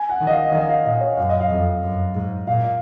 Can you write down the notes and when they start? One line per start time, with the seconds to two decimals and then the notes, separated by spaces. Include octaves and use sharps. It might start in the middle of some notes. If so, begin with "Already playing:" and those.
Already playing: G#5
0.09 F#5
0.21 D#3
0.27 D#5
0.31 F5
0.52 D#3 D#5
0.69 F5
0.85 A#2 D#5
1.01 C#5
1.17 F#2 F5
1.29 D#5
1.40 F5
1.50 F2
1.83 F#2
2.15 G#2
2.47 A#2 F5